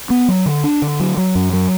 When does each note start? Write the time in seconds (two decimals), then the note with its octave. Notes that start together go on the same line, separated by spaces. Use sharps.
0.10 B3
0.28 F#3
0.46 D3
0.64 D4
0.82 D3
1.00 F#3
1.17 F#3
1.35 F#2
1.53 F#3